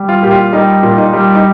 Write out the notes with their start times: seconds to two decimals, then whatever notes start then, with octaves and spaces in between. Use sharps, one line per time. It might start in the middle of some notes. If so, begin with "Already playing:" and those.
Already playing: G3
0.09 F4
0.22 A#2 G4
0.31 F4
0.53 G3 D#4
0.83 A#2
0.98 D#4
1.13 G3
1.35 D#4